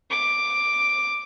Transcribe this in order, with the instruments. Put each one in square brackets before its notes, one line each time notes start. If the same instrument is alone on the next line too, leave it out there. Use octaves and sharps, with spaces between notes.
[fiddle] D6